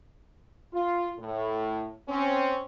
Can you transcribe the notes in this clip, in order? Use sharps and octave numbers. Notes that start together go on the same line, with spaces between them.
F4
A2
C4 C#4